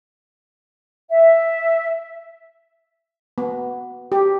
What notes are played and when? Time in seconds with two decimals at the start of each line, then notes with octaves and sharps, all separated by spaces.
1.10 E5
3.38 B3
4.12 G4